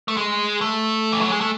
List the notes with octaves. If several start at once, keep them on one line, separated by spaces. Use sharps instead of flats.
A3
G#3
A3
E3
F#3
G#3
A3